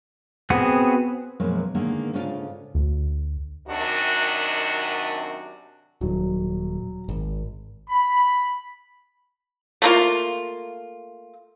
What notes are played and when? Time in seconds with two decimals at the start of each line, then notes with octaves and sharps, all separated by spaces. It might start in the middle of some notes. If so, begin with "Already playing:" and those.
0.50 B3 C4 F#4 G#4
1.40 F#2 B2 F3 F#3 G#3 A#3
1.74 D3 D#3 G#3 A#3 B3 G#4
2.13 G#2 C#3 D4 F4 A4
2.75 D2
3.68 F#2 C3 D#3 D4 F#4
6.01 D#1 F#3
7.09 G#1
7.89 B5
9.82 A3 A#3 F4